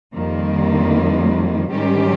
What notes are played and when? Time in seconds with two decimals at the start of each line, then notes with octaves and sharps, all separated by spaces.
0.14 F2 D#3 G3 A#3
1.71 G#2 D#3 G3 C#4 G4